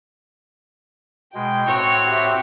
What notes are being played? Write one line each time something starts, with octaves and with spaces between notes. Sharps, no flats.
B2 G#3 G5
A2 C4 F#4 C#5
G4 E5